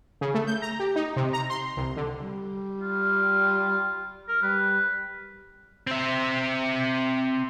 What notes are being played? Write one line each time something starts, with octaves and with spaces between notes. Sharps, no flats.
C#3
A3
G6
A#5
G4
D#4
C3
A#5
C6
C2
D3
G3
F4
A#4
G3 B4
C4 E5